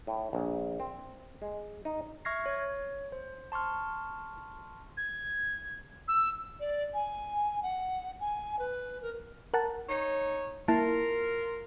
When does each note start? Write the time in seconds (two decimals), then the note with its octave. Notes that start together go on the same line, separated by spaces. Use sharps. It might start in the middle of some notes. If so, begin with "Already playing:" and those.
0.07 A2
0.33 A#1
0.80 C4
1.42 G#3
1.85 D#4
2.25 E5 C#6 F6 G#6 A#6 C7
2.46 C#5
3.12 C5
3.52 A5 C6 C#6 F6
4.97 G#6
6.08 E6
6.60 D5
6.94 G#5
7.63 F#5
8.20 G#5
8.59 B4
9.02 A#4
9.54 A#4 F#5 A5
9.89 D#4 C#5
10.68 A#3 E4 F4 A#4 A5